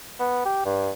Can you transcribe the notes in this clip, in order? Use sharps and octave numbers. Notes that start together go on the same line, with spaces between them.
B3
G4
G2